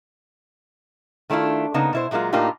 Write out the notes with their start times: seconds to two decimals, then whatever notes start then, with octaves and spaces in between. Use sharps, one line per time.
1.30 D#3 A3 D4 E4 F4
1.74 C#3 A#3 B3 D#4
1.93 B2 E4 C5
2.11 A#2 F#3 G#3 A#3 F4
2.33 A2 A#3 D4 D#4 F4 G4